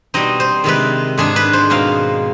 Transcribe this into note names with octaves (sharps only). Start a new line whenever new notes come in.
B2 G3 C4 D#4 D#5
C5
C3 D#3 G#3 C4 D#4 B4
G#2 D#3 G#3 D4 G#4
B4
C5
B2 G#3 C4 D#4 F5